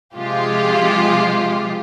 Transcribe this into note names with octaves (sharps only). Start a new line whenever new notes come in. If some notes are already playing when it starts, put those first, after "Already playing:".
C3 F3 G#3 F4 G4